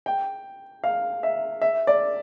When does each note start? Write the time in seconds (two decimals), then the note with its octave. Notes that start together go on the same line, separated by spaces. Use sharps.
0.06 G5
0.84 F5
1.23 E5
1.62 E5
1.87 D5